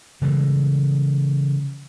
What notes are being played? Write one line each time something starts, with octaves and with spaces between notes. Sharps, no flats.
C#3 E3 G3 G#3